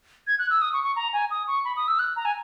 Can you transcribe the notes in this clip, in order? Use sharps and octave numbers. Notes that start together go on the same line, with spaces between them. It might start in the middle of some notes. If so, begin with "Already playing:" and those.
G#6
F#6
E6
D#6
C#6
C#6
A#5
G#5
D#6
C#6
B5
D#6
E6
F#6
A#5
G#5